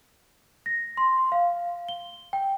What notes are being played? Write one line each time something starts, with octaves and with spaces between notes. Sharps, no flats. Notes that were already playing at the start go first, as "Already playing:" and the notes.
A#6
C6
F5
G7
G5